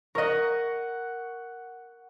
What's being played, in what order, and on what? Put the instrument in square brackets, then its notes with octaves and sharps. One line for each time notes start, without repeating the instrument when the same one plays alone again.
[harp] A#4 D#5 [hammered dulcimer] F#5 C#6